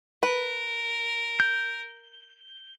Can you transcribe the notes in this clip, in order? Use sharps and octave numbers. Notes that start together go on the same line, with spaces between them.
A#4 B4
G6